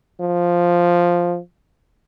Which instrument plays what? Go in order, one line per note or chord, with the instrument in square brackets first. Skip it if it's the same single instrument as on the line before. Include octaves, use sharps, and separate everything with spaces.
[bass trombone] F3